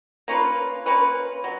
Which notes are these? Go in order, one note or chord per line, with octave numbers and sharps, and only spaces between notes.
A#3 C#4 F4 B4
A#3 C#4 F4 B4
F#3